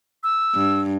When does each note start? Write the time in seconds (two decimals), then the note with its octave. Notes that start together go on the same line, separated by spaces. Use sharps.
0.23 E6
0.55 G2